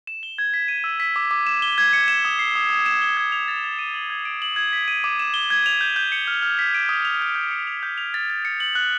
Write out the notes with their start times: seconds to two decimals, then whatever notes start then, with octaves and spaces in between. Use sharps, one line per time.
0.07 E7
0.23 G7
0.38 G#6
0.54 B6
0.68 D#7
0.84 E6
1.00 B6
1.16 D6
1.31 D6
1.47 E7
1.62 G7
1.78 G#6
1.93 C#7
2.08 E7
2.25 D#6
2.39 C7
2.55 D#6
2.70 D#6
2.86 E7
3.02 G7
3.17 G#6
3.32 F7
3.48 A6
3.64 A6
3.79 D#7
3.94 F#7
4.10 G#6
4.25 D7
4.42 F#7
4.56 G#6
4.73 B6
4.88 D#7
5.04 D6
5.19 E7
5.34 G7
5.50 G#6
5.66 F7
5.81 G6
5.96 G6
6.12 C#7
6.27 F6
6.42 F6
6.59 B6
6.74 D7
6.89 D#6
7.05 F7
7.21 G6
7.36 G6
7.51 C#7
7.67 F7
7.83 G6
7.98 F7
8.14 A6
8.30 A6
8.45 C#7
8.60 F#7
8.75 F#6